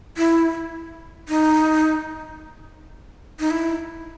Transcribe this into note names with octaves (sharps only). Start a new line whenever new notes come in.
E4
D#4
D#4
E4